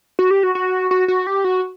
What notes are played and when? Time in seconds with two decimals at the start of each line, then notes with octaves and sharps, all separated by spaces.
0.19 F#4
0.31 G4
0.43 F#4
0.55 F#4
0.91 F#4
1.08 F#4
1.27 G4
1.44 F#4